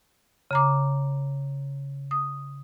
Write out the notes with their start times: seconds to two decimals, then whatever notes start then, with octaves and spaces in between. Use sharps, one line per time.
0.51 C#3 A#5 D6
2.11 D#6